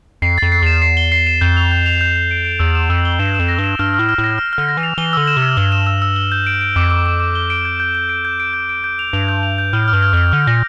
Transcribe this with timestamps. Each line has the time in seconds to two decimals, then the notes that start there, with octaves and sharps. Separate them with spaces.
0.22 F2 C7
0.38 F2 A6
0.52 C7
0.62 E2 E7
0.82 C7
0.97 G7
1.12 C7
1.27 E7
1.41 F2 G6
1.57 F7
1.72 G6
1.86 F7
2.01 G6
2.16 G6
2.31 D7
2.45 D7
2.60 E2 E6
2.75 E7
2.90 F2 E6
3.05 G7
3.19 G2 E7
3.35 F2 E7
3.49 A#6
3.59 G2
3.64 E7
3.79 G2 F6
3.94 A2 F6
4.09 F6
4.18 A2
4.24 A#6
4.38 F6
4.53 F6
4.58 D3
4.69 A#6
4.77 E3
4.83 F7
4.98 E3 G7
5.13 D3 E6
5.27 E7
5.37 C3
5.42 E6
5.57 G2 G7
5.72 E7
5.87 E6
6.02 E6
6.16 G7
6.32 G6
6.47 D7
6.61 D7
6.76 F2 D6
6.90 D6
7.06 D6
7.20 D6
7.35 G7
7.50 D7
7.65 G6
7.80 G6
7.95 G6
8.09 D7
8.25 G6
8.40 D7
8.53 G6
8.69 D7
8.84 G6
8.99 F7
9.13 G2 F7
9.28 G6
9.43 F7
9.58 G6
9.73 A2 F6
9.88 F6
9.93 G2
10.02 F6
10.13 F2 F6
10.32 D3 F6
10.47 A#2 A#6